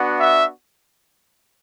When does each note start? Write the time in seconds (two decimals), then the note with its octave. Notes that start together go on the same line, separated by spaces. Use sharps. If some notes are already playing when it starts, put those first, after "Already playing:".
Already playing: B3 D4 F#4
0.19 E5